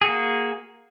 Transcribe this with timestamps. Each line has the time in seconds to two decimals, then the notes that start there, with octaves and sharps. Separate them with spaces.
0.02 G#4
0.04 F#4
0.07 A#3